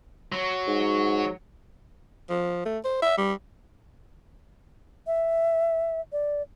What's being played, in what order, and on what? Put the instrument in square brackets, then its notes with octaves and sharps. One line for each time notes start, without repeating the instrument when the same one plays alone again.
[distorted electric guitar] F#3
[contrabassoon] G#2
[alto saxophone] F3
A3
C5
E5
G3
[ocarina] E5
D5